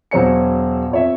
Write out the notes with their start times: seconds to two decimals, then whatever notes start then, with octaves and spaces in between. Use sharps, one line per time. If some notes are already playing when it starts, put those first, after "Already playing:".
0.11 E1 F#3 C5 C#5 G#5 C#7
0.91 F2 C#5 E5